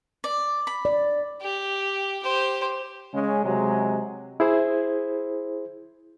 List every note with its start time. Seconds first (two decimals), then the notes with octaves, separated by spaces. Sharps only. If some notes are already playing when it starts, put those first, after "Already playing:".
0.24 D5
0.67 B5
0.85 D5
1.41 G4
2.23 G4 C5
3.13 C#3 G#3 C#4
3.43 C3 F#3 G#3
4.40 E4 G#4 C5